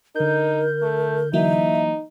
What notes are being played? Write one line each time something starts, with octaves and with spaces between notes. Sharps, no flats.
D3 D#4 A#4 G6
A3
E3 F#3 A#3 D#4 E5